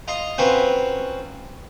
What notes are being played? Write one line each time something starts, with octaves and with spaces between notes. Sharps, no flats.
F4 D#5 A#5
C4 C#4 F4 F#4 A#4 B4